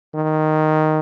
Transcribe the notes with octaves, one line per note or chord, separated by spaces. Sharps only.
D#3